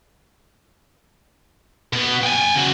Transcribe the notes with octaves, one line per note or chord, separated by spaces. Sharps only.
B2 B3
G5 G#5
C#3 F#4